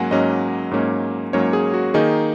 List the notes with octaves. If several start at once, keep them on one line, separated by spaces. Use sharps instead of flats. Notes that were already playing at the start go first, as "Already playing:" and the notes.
Already playing: G#2 F#3 A#3 C#4 F#5 G#5
G#2 F#3 A#3 C#4 D#5
G#2 F#3 A#3 C#4
G#2 F#3 A#3 C#4 C#5
G#4
F#4
D#3 A#3 D#4 G#4